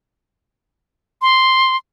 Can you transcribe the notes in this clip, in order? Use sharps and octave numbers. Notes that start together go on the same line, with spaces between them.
C6